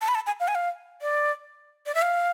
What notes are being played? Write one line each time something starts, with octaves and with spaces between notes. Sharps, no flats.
A5
B5
A5
G#5
F5
G#5
F5
D5
D5
E5
F5